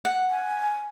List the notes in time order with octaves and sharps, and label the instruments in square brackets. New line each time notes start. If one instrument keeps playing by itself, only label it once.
[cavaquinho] F#5
[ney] G#5